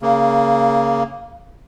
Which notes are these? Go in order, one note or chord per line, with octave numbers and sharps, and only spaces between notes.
C#3 A#3